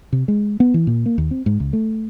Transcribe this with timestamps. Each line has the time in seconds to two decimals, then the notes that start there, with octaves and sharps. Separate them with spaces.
0.13 C3
0.28 G#3
0.60 B3
0.74 E3
0.87 A#2
1.06 A#3
1.18 D#2
1.31 C4
1.46 G#2
1.60 C#2
1.73 A3